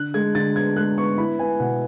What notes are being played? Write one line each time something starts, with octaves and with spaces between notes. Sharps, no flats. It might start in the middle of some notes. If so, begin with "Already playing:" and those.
Already playing: D3 F#6
G#3 G#6
D3 A6
B3 G#6
G#3 F#6
B3 C#6
E4 B5
B3 G#5
B2 F#5